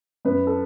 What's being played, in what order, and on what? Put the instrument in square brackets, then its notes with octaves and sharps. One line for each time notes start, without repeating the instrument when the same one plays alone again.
[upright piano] F#2 B4
A4